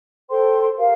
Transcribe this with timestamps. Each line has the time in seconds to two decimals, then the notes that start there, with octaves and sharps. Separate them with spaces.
0.29 A4 C5 G5 C6
0.77 G4 A#4 F5